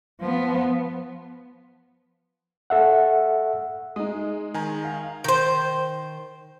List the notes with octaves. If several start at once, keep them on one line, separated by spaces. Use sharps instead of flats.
F3 B3
A4 E5 F#5
G#3 D#4 D#6
D#3 G#5 A#5
F5
D#3 C5